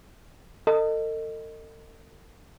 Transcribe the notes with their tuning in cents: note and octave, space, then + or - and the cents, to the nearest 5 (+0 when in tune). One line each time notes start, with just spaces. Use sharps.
A4 +45 D#5 -10